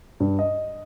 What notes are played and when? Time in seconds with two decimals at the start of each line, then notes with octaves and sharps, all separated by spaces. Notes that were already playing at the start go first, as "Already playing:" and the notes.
0.20 G2
0.39 D#5